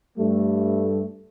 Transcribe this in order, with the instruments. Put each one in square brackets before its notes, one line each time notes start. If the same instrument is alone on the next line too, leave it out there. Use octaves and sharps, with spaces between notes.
[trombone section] G2 G3 A3